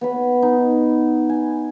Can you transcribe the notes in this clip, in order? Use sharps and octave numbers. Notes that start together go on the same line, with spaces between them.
B3 C#5 B5
D#4
G#5